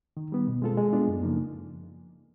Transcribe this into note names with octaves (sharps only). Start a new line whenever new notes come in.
D#3
G3 B3
B2
G#3 C4 F4 A4
G#3
B3 D4 F4
F#2
C#3 F3 A#3 D#4